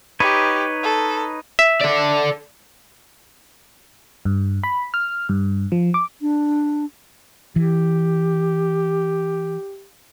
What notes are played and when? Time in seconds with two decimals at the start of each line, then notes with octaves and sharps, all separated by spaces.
0.20 D#4 G4 B4 C#5
0.83 A4
1.59 E5
1.81 A4 D5
4.25 G2
4.64 B5
4.94 F6
5.29 G2
5.72 F3
5.94 D6
6.22 D4
7.56 E3 G4